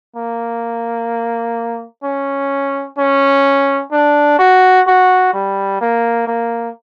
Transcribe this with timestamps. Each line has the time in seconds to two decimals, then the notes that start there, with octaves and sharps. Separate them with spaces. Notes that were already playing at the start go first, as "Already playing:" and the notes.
0.16 A#3
2.03 C#4
2.98 C#4
3.92 D4
4.39 F#4
4.87 F#4
5.34 G3
5.81 A#3
6.27 A#3